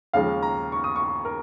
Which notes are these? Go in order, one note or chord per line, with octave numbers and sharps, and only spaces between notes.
D#2 C#3 F3 G#3 F5
A#5
C#6
D#6
C#6
A#4